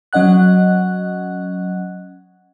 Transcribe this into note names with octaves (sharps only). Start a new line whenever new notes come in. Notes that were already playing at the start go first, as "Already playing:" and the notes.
F#3 C#4 D#5 F#5 F#6